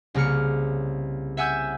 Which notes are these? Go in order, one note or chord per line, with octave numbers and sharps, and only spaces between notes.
C2 C#3 A#3 F6 C#7
E5 F#5 G#5 E6 G6